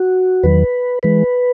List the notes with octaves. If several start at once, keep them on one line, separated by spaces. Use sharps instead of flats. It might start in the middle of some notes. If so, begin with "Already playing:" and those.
Already playing: F#4
E2 D#3 F#3 B4
E3 G#3 B4